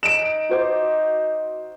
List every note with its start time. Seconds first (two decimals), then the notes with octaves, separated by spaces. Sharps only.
0.03 D#4 D7 E7
0.49 F#4 C5 D6